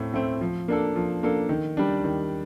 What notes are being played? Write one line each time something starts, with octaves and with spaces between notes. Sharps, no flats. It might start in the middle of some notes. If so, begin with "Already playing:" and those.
Already playing: A2 A3 C4
A3 C4
F3
A#3 D4 A4
F3
A#3 D4 A4
D#3
G3 D4
D#3